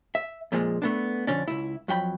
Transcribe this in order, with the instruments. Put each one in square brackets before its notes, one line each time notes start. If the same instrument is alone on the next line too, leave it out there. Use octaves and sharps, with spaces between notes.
[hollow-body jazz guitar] E5
F2 A#2 F3 G#3
A3 B3 D4
F2 D3 C#4 D4
C#2 E4
F2 F#3 G5 B5